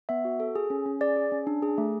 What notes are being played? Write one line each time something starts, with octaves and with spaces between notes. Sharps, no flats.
B3 E5
F#4
A4
G#4
C#4
C#4
G#4 D5
G#4
C#4
D4
G#4
A3